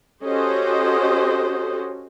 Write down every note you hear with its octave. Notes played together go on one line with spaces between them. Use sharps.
C#4 F#4 G4 A4 C5 D#5